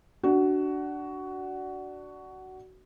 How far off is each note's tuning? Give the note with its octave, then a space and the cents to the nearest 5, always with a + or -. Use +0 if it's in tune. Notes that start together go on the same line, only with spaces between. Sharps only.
D4 +0 F#4 +15